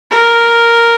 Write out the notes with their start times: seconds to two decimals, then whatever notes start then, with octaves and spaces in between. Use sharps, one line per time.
0.11 A#4